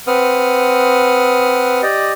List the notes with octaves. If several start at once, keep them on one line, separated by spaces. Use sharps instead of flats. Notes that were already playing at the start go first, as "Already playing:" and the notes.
C4 B4 F#5 D#6 F6
G4 D5 D#5